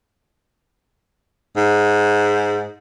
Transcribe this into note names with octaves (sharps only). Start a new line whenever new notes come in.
G#2